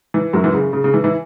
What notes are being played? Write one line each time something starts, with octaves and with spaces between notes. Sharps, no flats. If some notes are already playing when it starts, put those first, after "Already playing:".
E3
F#2 F#3
E3
C#3
C#3
C#3
E3
E3 E4